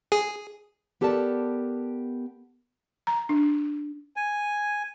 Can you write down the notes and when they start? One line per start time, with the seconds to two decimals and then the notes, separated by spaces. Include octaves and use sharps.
0.12 G#4
1.01 B3 G4 A4 A#4 D5 A5
3.07 A#5
3.29 D4
4.16 G#5